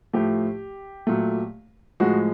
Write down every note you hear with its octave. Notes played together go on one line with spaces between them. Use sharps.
A2 F3 A3 G4
A#2 F#3 A3
A2 F3 G#3 F#4